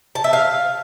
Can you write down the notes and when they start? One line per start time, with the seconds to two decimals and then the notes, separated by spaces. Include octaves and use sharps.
0.15 A5
0.24 E5
0.33 F5